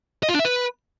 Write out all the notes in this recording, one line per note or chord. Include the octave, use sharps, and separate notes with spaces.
D#5
F4
D4
E5
B4